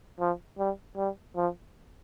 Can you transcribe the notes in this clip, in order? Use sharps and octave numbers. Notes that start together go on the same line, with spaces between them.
F3
G3
G3
F3